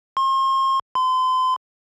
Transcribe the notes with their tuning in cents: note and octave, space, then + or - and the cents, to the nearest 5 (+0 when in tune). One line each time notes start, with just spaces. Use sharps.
C6 +40
C6 -35